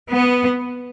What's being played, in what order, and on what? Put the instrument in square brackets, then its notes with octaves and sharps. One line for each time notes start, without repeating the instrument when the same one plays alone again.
[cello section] B3